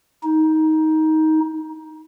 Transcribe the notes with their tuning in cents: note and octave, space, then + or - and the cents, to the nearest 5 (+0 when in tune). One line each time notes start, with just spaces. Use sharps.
D#4 +15